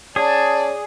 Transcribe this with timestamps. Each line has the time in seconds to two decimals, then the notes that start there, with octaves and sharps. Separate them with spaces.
0.16 C#4 G#4 D5 A5